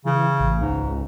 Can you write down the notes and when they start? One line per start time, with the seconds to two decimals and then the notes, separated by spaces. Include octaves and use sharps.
0.05 C#3 E3
0.40 A1
0.62 C#2 G#2